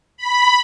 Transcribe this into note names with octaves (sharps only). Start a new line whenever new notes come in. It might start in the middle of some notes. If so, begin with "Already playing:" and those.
B5